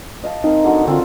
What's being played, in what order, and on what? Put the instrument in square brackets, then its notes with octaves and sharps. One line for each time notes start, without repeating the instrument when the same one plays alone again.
[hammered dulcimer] D#5 F5 A5
[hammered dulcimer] C4 A#4 [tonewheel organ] D#4
[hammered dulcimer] D3 F#3 F#4
[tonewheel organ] D3 [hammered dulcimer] C4 F4